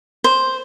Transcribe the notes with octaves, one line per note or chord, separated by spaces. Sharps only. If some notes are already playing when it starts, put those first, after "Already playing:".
C5